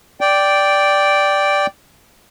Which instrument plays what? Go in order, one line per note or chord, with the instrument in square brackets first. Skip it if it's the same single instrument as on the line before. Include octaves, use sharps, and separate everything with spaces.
[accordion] D5 G5